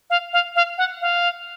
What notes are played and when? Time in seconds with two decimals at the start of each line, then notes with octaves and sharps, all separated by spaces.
0.10 F5
0.33 F5
0.56 F5
0.78 F#5
1.01 F5